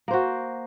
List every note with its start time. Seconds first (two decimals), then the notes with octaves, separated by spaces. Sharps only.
0.08 A#3
0.11 C5
0.13 F#4